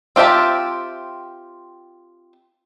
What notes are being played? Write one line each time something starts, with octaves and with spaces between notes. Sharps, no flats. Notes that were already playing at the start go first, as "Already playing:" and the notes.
C4 F4 G4 E5 A5